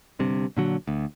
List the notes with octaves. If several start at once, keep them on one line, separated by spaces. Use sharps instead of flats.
G1 G2 C3
A#2 D3 F#3
D2